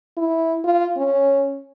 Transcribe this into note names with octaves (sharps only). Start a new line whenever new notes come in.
E4
F4
C#4